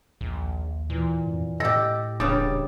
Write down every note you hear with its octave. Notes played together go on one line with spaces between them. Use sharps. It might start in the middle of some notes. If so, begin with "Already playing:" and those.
A#1 D#2
A#2 E3
F2
A2 G4 A4 D#5 A#6
D#1 G2 C#3 D6 D#6 A6